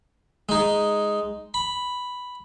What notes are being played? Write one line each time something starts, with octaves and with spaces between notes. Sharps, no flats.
G#3 D#4
B5